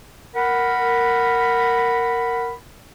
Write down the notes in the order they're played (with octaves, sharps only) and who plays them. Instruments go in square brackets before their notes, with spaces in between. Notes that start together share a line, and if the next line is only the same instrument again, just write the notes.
[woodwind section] A#4 F#5 B5